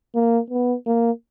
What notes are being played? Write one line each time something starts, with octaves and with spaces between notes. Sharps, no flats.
A#3
B3
A#3